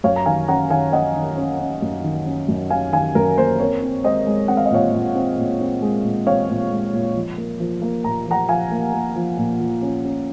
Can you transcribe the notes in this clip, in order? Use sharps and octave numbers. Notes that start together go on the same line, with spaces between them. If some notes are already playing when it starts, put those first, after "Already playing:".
F#2 C#5 F5
A#5
D#3 F5 G#5
C#4 F#5 A#5
D#3 F5 G#5
C#4 D#5 F#5
D#3
C#4
C#4
F#2
D#3
C#4
F#2
C#4 F5 G#5
D#3 F5 G#5
F#2 A#4
A#3 C5
C4 A#4 C#5
C4
G#3 C5 D#5
G#3
C4 F#5
F5
D#5
A#2 C#5 F5
A#2
C4
A#2
C4
G#3
A#2
C4 C#5 F5
A#2
G#3
A#2
F3
A#3
F3
A#3
A#2 A#5
F3 F#5 A#5
F3 F5 G#5
A#3
A#3
F3
A#2
F3
C#4
C#4